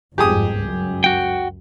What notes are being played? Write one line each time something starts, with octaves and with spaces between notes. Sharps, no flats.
G1 F2 G#2 G4 G#4 D#6
C#2 F#2
F#4 G5